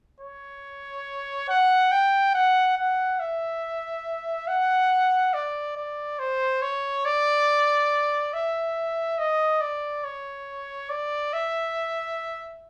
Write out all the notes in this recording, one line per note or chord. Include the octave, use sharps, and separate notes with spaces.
C#5
F#5
G5
F#5
F#5
E5
F#5
D5
D5
C5
C#5
D5
E5
D#5
D5
C#5
D5
E5